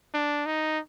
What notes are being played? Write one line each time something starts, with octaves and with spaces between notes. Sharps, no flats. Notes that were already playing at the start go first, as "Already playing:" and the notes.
D4
D#4